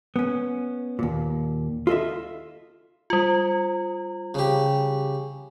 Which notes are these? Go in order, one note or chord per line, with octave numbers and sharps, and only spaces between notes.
B3 C#4
D#2 A#2
F4 A4 D#5 E5
G3 F4
C#3 G4